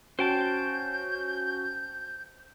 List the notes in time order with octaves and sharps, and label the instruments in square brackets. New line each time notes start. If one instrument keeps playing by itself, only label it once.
[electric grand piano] C#4 F#4 [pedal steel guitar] C5 G5 A5 [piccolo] G6